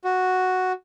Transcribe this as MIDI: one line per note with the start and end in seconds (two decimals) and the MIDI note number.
0.05 0.72 66